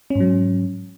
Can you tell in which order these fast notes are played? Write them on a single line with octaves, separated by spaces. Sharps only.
C#4 G#2 F#3